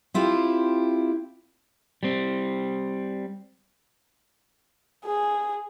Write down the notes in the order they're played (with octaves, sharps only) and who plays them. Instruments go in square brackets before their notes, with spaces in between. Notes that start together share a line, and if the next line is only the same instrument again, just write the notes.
[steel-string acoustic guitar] C4 E4 F4 G4
[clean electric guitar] G3 C4
[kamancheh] G#4